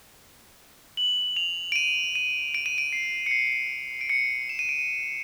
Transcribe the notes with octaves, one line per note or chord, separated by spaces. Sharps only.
F#7
F7
D7
D#7
D#7
D7
D#7
D7
C7
C#7
C7
D7
C#7
E7
D#7
D7
D#7